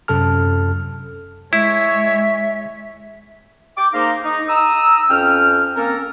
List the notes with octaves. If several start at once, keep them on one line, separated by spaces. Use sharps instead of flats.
F#2 C3 A4 A5 F6
G#3 E4 C#5 E5
G5 D6
A#3 D#4 G#4 A#4 C5 F5
D#4
A#5 D#6 E6
F2 C#4 G5 F6
A#3 C4 C#4 A4 A#4